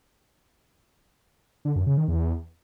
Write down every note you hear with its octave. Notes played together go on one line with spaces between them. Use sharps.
D3
F#2
C#3
D#3
E2